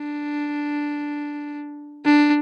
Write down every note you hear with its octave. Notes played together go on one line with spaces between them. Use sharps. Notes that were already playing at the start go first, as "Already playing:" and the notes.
Already playing: D4
D4